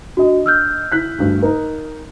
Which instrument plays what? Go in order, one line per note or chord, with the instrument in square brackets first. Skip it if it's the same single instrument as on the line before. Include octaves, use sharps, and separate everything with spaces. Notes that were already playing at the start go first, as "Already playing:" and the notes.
[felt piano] D4 D#5 [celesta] F#4
[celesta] E6 F6 G6
[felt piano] E4 F#6 B6
D2 G2
D#4 A#4